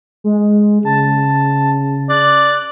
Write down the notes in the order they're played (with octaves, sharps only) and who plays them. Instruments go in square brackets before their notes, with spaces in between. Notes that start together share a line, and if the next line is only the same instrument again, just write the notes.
[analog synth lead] G#3
[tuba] C#3 [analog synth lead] A5
[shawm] D5 [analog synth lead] F#6